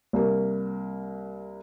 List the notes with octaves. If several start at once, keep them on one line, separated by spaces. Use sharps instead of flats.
C2 A#3